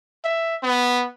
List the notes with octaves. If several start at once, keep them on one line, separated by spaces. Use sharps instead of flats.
E5
B3